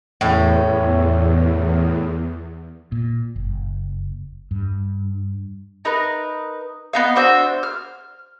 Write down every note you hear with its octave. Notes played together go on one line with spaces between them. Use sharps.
E2 A2 C#4
A#2
F#1
G2
D#4 A#4 B4
B3 D#4 F5
D4 F#4 C5 E5
F6